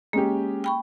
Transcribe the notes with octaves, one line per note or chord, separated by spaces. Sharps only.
G#3 A#3 C#4 G4
G5 B5 C#6